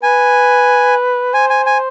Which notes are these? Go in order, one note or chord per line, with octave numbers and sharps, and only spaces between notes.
B4 G#5
C5 G#5
G#5
G#5